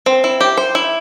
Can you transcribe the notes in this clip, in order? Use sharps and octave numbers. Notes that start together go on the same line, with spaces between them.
C4
E4
G4
C5
E4